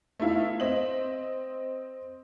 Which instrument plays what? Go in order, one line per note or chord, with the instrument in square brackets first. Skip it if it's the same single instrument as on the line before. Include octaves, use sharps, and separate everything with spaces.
[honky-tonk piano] A3 B3 D#4 E4 E5 F5
C4 D#5 F#7